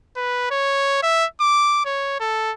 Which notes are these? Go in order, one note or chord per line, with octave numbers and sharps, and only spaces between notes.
B4
C#5
E5
D6
C#5
A4